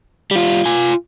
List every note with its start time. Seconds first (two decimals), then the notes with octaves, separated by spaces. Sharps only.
0.31 G3 F4
0.66 F4 G#5